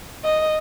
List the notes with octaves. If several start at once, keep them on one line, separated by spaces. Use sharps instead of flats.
D#5